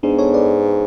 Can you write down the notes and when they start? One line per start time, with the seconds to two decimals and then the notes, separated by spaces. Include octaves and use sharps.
0.03 G#2 B3 D4
0.18 A4 C#5
0.34 B4 D5